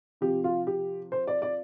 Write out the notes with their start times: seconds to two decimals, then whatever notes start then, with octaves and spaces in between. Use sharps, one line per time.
0.21 C3 F3 G4
0.44 F4
0.67 G4
1.12 C5
1.28 D5
1.42 D5